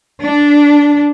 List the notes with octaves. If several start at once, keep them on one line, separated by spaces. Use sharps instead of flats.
D4